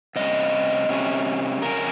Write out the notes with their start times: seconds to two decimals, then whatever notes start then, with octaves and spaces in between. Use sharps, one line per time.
0.16 C3 G3 C#4 D#5
0.89 C3 G3 C#4
1.62 F2 C#3 C#4 A#4